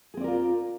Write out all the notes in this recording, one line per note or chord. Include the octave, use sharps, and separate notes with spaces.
C4 F4 G#4 A#4 D5